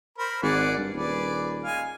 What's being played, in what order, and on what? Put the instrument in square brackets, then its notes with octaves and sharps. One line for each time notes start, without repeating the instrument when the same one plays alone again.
[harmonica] A#4 C5 B5
[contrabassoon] G#1 [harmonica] G#4 D5 F#5
[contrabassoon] G2
[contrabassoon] D#1 [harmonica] G#4 B4 D5
[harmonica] G#3 F5 G#5